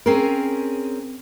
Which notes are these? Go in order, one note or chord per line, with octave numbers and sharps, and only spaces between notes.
C4 C#4 G#4 A#4